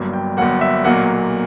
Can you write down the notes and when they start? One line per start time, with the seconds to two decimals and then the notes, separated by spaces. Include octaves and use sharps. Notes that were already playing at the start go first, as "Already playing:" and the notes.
Already playing: G1 G2 F#3 A#3
0.13 G5
0.37 G1 G2 F#3 A#3 F#5
0.61 E5
0.85 B1 A#2 F#3 A#3 F#5